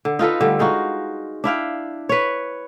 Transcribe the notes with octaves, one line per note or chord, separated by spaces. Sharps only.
D3
D#4 F4 A4 B4
D3 G3 A3
G#3 D#4 F4 F#4
D4 E4 F5 G5
B4 C#5